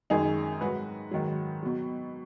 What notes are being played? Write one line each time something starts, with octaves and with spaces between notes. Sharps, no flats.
F#2 D#3 G#3 D#4 G#4
G#2 F#3 F#4 B4
G#2 D#3 F#3
B2 F#3